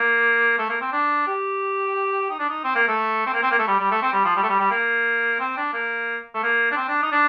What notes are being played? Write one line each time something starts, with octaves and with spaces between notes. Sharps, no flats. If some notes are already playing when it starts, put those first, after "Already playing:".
Already playing: A#3
A3
A#3
C4
D4
G4
D#4
D4
D#4
C4
A#3
A3
C4
A#3
C4
A#3
A3
G3
G3
A3
C4
G3
F3
G3
A3
G3
G3
A#3
C4
D4
A#3
A3
A#3
D4
C4
D4
D#4
D4